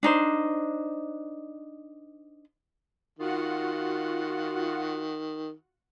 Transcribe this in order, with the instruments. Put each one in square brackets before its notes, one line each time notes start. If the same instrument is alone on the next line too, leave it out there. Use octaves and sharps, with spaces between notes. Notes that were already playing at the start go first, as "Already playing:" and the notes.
[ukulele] D4 D#4 C5
[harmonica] D#3 [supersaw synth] F4 F#4 F#5